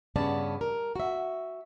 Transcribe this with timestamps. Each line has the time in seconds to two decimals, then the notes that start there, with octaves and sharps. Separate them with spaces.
0.16 G2 C#3 B3 C#4 D5 A5
0.61 A#4
0.96 F#4 E5